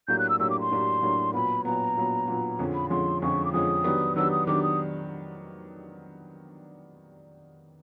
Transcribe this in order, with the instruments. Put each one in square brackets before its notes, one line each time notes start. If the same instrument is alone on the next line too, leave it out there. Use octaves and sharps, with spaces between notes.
[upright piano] A2 F#3 A#3 D4 G4 [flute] G6
[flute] F#6
E6
[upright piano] A2 F#3 A#3 D4 G4 [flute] E6
[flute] D6
C6
[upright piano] A2 F#3 A#3 D4 G4
A2 F#3 A#3 D4 G4
[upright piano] A#2 F#3 B3 [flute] B5
[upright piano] A#2 F#3 B3 [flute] A#5
[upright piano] A#2 F#3 B3
A#2 F#3 B3
F2 D3 F3 G#3 C#4
[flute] B5
[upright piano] F2 D3 F3 G#3 C#4 [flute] C6
[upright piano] F2 D3 F3 G#3 C#4 [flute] C#6
[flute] D6
[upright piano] F2 D3 F3 G#3 C#4 [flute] D#6
[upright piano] D#3 F#3 B3 D4 G4
[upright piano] D#3 F#3 B3 D4 G4 [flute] E6
[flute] D#6
[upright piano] D#3 F#3 B3 D4 G4 [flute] D6
[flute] D#6